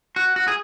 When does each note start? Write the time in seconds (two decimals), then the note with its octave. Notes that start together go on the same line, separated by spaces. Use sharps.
0.16 F#4
0.36 F#4
0.48 G#4